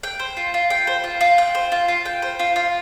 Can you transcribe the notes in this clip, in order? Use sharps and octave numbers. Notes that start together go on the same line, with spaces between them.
G5
C5
F4
F4
G5
C5
F4
F4
G5
C5
F4
F4
G5
C5
F4
F4